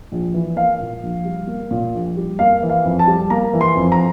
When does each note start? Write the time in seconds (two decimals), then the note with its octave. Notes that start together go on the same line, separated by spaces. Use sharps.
0.12 A#1
0.34 E3
0.56 A#3 F5
0.80 A#2
1.03 A#1
1.25 G3
1.47 A#3
1.71 A#2
1.94 A#1
2.17 G3
2.39 A#3 F5
2.63 E3
2.69 F5
2.84 F2
2.99 A5
3.07 G3
3.30 A#3 A#5
3.53 E3
3.61 C6
3.75 F2
3.92 A#5